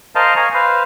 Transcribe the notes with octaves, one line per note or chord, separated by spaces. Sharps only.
A#4 C5 D#5 F5 A5
D#5 F5 G#5 A#5 C#6
B4 C5 F5